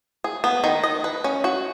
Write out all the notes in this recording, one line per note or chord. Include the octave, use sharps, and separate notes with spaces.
G#4
B3
D#3
D#5
B4
C#4
F#4